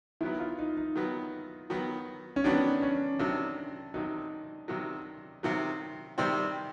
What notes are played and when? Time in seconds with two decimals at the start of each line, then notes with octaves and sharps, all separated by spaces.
0.21 D#3 F#3 B3 E4
0.40 F4
0.59 D#4
0.77 D#4
0.96 D#3 F#3 B3
1.70 D#3 F#3 B3
2.36 C#4
2.44 D#3 F#3 B3 D4
2.82 C#4
3.19 C3 D#3 F#3 D4
3.94 C3 D#3 F#3 D#4
4.68 C3 D#3 F#3
5.43 C3 D#3 F#3
6.18 C3 D#3 G3 C4